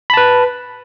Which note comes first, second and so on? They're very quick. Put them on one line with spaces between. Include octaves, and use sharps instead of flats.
B5 A5 B4